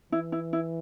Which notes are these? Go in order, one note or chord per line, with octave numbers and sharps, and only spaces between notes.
E3 E4
E4
E4